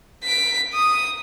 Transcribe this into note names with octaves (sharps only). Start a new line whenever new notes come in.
B6 D7
D#6